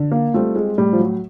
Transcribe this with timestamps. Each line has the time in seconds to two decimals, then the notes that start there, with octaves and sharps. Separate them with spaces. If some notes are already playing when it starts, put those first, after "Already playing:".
Already playing: D3
0.11 A#3
0.34 G3 A3 C4 F4
0.56 G#3
0.78 A2 G3
0.93 F3
0.99 F#3